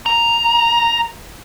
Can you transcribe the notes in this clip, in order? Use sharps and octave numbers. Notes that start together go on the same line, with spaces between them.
A#5